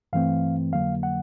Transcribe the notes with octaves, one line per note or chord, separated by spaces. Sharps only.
G2 E3 A3 C4 F5
F2 D3 F#3 A#3 F5
F#5